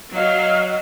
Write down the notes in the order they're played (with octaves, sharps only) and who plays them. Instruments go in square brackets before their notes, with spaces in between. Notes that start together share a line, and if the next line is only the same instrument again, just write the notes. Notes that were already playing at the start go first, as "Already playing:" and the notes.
[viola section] F#3 [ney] D#5 [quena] F5